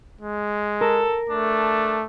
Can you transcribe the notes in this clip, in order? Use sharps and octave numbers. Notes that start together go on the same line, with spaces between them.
G#3
A4 A#4
A3 D4